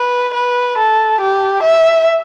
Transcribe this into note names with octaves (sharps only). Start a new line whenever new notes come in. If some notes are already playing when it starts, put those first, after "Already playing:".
Already playing: B4
B4
A4
G4
E5